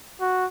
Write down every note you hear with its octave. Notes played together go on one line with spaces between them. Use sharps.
F#4